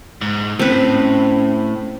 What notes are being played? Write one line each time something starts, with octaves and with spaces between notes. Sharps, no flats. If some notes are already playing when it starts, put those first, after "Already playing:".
G#2
A2 C4 C#4 B4